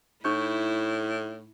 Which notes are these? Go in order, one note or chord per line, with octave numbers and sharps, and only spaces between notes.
A2 D#4 E4 C#6 G6